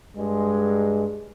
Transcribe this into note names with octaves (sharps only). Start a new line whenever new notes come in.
G2 G#3